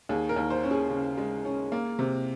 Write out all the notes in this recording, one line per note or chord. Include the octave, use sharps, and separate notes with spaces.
D#2 G#4
A#4
D#2
C5
C#4
G#4
C#3
G#3
C#4
A#3
C3